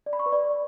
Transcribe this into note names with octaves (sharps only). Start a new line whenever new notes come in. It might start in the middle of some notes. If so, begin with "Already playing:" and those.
D5
B5
C#6
B4
D5